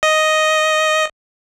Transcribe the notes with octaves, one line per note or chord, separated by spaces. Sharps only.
D#5